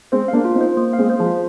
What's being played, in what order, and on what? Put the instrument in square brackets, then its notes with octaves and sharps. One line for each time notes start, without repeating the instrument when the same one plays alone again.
[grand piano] G#3 C4 [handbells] C5
[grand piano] A#3 D4 [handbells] F5
[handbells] F4
[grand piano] C4 D#4
[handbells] C5
A#3
F5
[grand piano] G#3 C4
[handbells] C5
[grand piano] F3 G#3
[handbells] F4